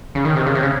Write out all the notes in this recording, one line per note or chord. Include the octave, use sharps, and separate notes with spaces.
C#3
D#3
C3
C#3
C3
C#3